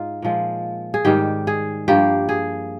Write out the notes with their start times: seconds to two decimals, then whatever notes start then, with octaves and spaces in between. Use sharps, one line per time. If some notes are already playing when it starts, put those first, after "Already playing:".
Already playing: G#2 D#4 F4
0.22 A#2 F3 G#3
0.94 G#4
1.05 G#2 D#3 G3 G4
1.47 G#4
1.88 G2 F3 A#3 G4
2.29 G#4